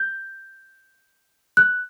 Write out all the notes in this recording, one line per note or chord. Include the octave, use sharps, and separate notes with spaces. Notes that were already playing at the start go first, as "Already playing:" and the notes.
Already playing: G6
F#6